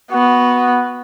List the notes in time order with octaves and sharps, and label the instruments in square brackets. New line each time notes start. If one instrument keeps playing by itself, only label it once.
[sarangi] B3 [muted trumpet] F#4